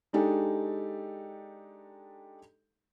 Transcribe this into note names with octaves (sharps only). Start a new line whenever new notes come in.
G#3 D4 D#4 G4 A4